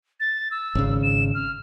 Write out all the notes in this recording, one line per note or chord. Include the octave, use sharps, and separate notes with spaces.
A6
E6
G#1 C#3
E7
F6